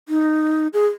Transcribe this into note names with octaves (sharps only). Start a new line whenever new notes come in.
D#4
G#4